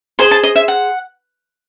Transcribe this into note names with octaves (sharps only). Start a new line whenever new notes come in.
G#4 C5 D#5 C6
A5
D#5
E5
F#5